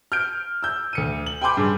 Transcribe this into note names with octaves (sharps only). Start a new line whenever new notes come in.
F6 G6 D7
E6 G6
D2 C#7 D#7
F#7
G5 G#5 B5 C6 D6 G6
G2 C#3